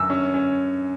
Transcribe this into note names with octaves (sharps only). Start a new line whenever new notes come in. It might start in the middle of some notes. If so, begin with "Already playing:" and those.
Already playing: F#2 E6
C#4
C#4